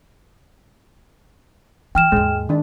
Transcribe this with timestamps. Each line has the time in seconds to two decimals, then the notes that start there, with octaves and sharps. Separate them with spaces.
1.95 E3 G5 F6 E7
2.12 D#2 G#2 G#3
2.49 D#3 D4